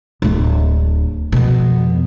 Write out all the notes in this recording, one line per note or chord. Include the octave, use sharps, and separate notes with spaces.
D1 A3
F2 B2